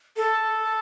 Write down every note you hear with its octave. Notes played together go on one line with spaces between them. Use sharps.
A4